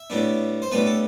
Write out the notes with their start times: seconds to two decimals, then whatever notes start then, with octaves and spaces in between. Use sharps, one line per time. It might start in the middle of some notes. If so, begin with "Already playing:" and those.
Already playing: E5
0.10 A2 G3 B3 D4
0.62 C5
0.71 A2 G3 B3 D4 B4
0.86 A4